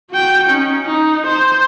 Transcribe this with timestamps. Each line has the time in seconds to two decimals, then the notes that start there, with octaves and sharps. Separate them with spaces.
0.10 F#4 G5
0.50 C#4 D#4
0.85 D#4
1.27 C5